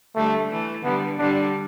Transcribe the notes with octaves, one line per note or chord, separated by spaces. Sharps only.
D3 G3 A3
E3 A3
D3 G3 B3
D3 G3 D4